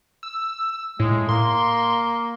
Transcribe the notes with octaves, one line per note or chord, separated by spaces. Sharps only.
E6
A2 G#3
A#3 C6